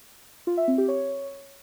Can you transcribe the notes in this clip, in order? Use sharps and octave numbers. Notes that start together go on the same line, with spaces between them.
F4
E5
C4
G4
C#5